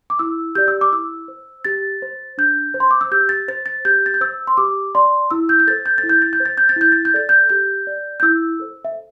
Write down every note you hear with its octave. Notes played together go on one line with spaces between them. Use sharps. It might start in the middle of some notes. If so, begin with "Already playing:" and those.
D6
E4 E6
G4 D5 G6
E6
D6
E4 E6
C5
G4 A6
C5
D4 G6
C5
C6
D6
E6
G4 G6
A6
C5 A6
A6
G4 G6
A6
G6
C5 E6
C6
G4 D6
D5 C6
E4 E6
G6
G6
A4 C5 A6
G6
A6
E4
G6
A6
G6
C5
A6
G6
A6
E4 G6
A6
G6
A4 D5 A6
G6
G4 G6
D5
G6
E4 E6
A4 C5
E5